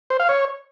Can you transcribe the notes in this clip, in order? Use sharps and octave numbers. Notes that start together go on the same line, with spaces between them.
C5
F5
C#5